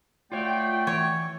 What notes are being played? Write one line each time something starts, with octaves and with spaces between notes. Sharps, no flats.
A3 F4 F#4 C#5 D5 G5
E3 C#5